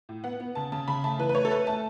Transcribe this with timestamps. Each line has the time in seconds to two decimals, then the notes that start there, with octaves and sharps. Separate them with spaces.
0.09 A2
0.24 B3 F#5
0.40 B3
0.55 C#3 A5
0.72 C#3 A5
0.88 C#3 B5
1.04 A3 A5
1.19 E3 B4
1.29 B4
1.35 A3 C#5
1.45 A4
1.51 A3 B4
1.67 A3 A5